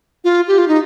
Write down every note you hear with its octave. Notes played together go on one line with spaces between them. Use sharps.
F4
G4
F4
D#4